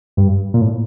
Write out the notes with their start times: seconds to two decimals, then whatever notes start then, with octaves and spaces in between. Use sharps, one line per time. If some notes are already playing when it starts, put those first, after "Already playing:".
0.17 G2
0.54 A#2
0.61 A2